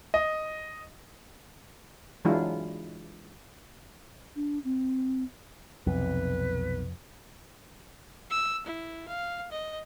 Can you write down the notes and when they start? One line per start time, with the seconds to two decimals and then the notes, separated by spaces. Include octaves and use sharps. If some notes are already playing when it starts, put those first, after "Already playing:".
0.14 D#5
2.25 E3 F#3 G#3 D4 E4 F4
4.36 D4
4.64 C4
5.86 B1 F2 C3 B4
8.30 E6
8.66 E4
9.08 F5
9.52 D#5